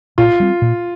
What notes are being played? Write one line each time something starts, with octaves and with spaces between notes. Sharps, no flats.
A#2 F4
G3 C4
A#2